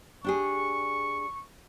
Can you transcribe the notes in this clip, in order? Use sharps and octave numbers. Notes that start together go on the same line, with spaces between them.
D4 G4 G#4 C#6